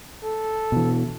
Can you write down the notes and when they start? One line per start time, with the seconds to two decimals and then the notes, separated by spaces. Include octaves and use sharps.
0.24 A4
0.72 B2 E3